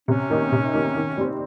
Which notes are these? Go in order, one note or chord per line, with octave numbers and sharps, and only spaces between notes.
C3 C#4
D#3 A#3 D#4
C3
D#3 A#3 D#4
D#3
G3 C4